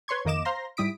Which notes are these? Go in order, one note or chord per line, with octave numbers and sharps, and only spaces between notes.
B4 C#5 C6 C#6 G#6
F2 D#3 A#3 D#5 D6 E7
C5 F5 A#5 C6 A#6
G#2 G3 E4 D#6 B6 D7